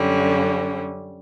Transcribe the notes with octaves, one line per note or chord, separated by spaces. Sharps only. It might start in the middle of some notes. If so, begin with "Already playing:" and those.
Already playing: F#2 D3 G3 C#4